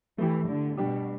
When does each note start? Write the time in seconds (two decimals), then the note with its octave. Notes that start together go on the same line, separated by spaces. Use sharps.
0.18 E3 A3 E4 G4
0.48 D3
0.77 B2 G3 D4 G4